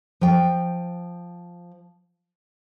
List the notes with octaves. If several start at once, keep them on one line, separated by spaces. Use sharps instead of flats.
F3 G5